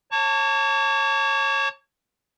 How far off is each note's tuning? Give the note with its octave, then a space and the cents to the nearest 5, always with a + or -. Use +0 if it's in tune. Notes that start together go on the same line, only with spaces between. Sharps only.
C#5 -25 A5 +25 C#6 +40